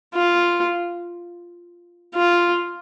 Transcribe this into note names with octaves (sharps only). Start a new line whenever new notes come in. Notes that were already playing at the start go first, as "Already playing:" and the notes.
F4
F4